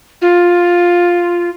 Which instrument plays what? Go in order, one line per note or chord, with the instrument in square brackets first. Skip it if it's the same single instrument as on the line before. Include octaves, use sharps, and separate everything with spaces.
[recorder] F4